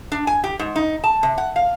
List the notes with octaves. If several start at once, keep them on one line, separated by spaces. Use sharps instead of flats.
D4
G#5
G4
G#2
D#4
A5
C3
F#5
F5